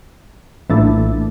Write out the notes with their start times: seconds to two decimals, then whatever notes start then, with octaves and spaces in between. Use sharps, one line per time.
0.70 A#1 A2 E3 A3 D4